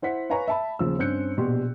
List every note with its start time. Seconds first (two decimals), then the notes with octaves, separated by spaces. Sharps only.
0.02 E4 C5 F#5 B6
0.30 B4 C#5 F5 G#5 A#5 C#6
0.48 E5 A5 B5
0.79 D#2 C#3 F3 E6
0.99 G2 C4 C#4 F#6 G6 C#7
1.37 A#1 B2 G4 C6